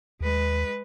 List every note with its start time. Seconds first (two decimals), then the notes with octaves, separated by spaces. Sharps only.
0.21 D#2 G#3 B4